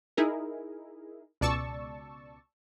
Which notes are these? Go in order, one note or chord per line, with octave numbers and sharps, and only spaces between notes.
D#4 E4 G#4 A#4
C#2 B2 D5 A5 C#6 E6